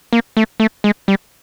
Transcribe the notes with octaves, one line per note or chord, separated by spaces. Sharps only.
A#3
A3
A3
G#3
G3